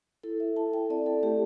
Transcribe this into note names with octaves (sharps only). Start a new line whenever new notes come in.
E4 A4
E5
E4 A5
G5
C4 D5
A4
A3 G4